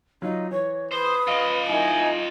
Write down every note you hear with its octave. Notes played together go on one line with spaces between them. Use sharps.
F#3 D#4 F4
E3 C#5
B4 C5 D#6
F4 D#5 F5
D#4 E4 A#4 G#5